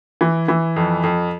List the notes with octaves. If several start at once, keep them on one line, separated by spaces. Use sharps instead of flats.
E3
E3
F2
F2